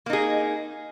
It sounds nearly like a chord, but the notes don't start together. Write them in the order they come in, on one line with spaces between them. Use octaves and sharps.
A#3 D#4 G#4